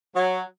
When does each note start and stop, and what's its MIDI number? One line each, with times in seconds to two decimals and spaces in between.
0.14 0.40 54